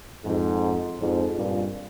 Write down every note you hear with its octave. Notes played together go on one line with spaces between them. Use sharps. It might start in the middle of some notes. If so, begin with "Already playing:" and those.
F2 G#2
F2 G#2
G2 A#2